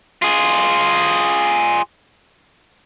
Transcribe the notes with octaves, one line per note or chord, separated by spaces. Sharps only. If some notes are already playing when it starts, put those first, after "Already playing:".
F4 G#4